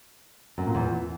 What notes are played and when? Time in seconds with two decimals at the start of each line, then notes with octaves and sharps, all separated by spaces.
0.58 F#2
0.66 A#2
0.75 E2